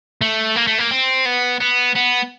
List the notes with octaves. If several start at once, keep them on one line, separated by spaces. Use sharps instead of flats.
A3
A#3
A3
A#3
C4
B3
B3
B3